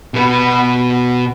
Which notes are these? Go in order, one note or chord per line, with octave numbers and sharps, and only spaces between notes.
B2 B4